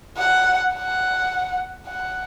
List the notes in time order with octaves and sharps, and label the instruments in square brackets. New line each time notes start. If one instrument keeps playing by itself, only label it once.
[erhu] F#5
F#5
F#5